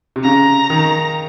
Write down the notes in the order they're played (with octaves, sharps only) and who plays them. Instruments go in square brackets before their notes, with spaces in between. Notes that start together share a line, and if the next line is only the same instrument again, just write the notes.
[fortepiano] C3
[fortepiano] C#3 [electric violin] A#5
[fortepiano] D#3